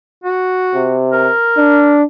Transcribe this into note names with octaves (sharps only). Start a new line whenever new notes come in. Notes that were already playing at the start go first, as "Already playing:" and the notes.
F#4
C3
A#4
D4